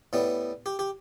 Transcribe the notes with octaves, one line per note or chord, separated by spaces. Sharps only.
A2 G3 B3
G4
G4